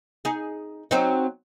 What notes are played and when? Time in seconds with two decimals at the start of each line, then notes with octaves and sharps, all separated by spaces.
0.25 D#4 G#4
0.91 F#3 C4 D#4